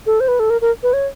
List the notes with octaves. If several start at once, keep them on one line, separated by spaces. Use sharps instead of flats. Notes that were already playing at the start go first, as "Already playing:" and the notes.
A4
C5
B4
A4
A#4
A#4
B4
C#5